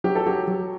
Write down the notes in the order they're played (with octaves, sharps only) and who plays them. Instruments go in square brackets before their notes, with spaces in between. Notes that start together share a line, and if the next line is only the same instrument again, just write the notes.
[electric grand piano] F#3 [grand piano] G4
[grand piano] A4
[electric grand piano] F#3 [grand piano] G4
[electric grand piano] F#3